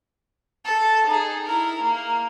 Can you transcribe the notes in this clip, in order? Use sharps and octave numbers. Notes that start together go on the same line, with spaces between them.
A4 A5
D#4 G#4
E4 A#4
A#3